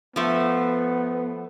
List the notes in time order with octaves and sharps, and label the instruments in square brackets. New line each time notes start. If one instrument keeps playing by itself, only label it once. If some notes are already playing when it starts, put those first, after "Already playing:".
[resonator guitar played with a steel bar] F3 A3 [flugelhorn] B3